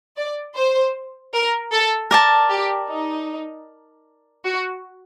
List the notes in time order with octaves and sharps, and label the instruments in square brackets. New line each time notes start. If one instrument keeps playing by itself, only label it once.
[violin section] D5
C5
A#4
A4
[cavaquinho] A#4 D5 A5
[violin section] G4
D#4
F#4